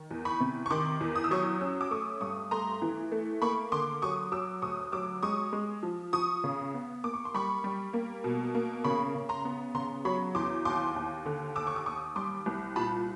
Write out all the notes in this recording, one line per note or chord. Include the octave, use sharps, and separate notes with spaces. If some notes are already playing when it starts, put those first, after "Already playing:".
Already playing: D#3
E2
B5 C#6
C3
C#6
D#3 C6 D6
E2
D#6
E6
F#3 C#6 D#6
C#4 E6
D6 E6
A3 C#6 D#6
G2 C#6 D#6
A3 A#5 C6
E3
A3
A#3 B5 C#6
D3 C6 D6
F#3 C#6 D#6
F#3 D6 E6
D2 C#6 D#6
F#3 D6 E6
G#3 C#6 D#6
G#3
F3
F3 C#6 D#6
C#3
B3
A#3 D6
C#6
C6
G3 B5 C#6
G3
A#3
B2
A#3
C#3 B5 C#6
C#3
A#5 C6
B3
C#3 A#5 C6
F#3 B5 C#6
E2 C6 D6
D#2 C6 D6
D#2
D3
D#2 D6 E6
C#6
D6
D#2 C#6 D#6
G3 C6 D6
C2
A#2 A5 B5